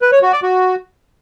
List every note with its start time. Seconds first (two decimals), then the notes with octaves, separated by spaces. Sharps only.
0.02 B4
0.12 C#5
0.22 F#4
0.32 D5
0.43 F#4